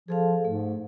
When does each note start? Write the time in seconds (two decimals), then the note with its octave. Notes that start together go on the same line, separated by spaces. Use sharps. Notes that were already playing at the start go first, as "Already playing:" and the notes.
0.08 F3 G#4 A4 F5
0.45 G#2 A3